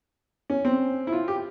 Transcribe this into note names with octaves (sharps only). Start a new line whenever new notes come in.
C#4
C4
E4
F4
G4